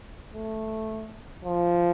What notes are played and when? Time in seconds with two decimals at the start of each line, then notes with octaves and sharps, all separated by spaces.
0.34 A3
1.45 F3